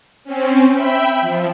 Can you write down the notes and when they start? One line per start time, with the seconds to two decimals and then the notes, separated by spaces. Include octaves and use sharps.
0.24 C4 C#4
0.73 E5 G5 B5
1.21 F3